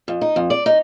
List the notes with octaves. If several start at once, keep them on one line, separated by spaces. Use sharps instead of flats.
F2
D#4
F2
D5
D#4